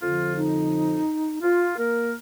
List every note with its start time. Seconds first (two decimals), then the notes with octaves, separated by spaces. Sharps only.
0.02 F2 D3 F3 F4
0.37 D#4
1.42 F4
1.78 A#3 A#4